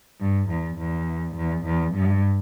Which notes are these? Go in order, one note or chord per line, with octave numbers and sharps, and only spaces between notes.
G2
E2
E2
E2
E2
G2